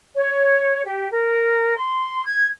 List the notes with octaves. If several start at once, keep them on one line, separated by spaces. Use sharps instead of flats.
C#5
G4
A#4
C6
G#6